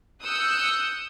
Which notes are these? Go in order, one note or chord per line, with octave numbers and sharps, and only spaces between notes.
D#6 E6 F#6 G6 C#7